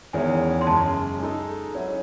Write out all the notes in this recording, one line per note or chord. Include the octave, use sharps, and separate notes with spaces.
E2 D#3 G#3 C#4 E4 G#5
C6
F#2 C#3 G#3 A5
G#3 D#4 A4
F#3 C#4 E4